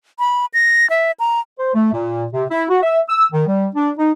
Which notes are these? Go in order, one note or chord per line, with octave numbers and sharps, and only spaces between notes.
B5
A#6
E5
A#5
C5
A3
A#2
C3
E4
F#4
E5
E6
D#3
G3
D4
D#4